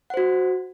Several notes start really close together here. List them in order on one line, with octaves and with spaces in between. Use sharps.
F#5 C5 F#4